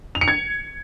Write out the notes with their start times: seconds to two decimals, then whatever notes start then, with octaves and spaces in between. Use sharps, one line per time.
0.15 F7
0.21 C#7
0.28 G#6